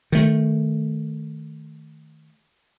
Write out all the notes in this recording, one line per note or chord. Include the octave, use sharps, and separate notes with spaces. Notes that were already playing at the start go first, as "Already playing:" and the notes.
D#3 A3